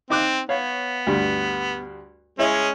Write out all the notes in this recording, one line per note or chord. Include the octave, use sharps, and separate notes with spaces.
C4 D#4 D6 F#6
B3 C#5 F5
D2 G2
G#3 C#4 E4 G#4 C#5 D#5